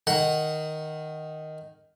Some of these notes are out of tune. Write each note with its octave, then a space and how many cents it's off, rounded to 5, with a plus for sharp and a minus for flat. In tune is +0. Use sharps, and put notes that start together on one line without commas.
D#3 +0 F#5 +5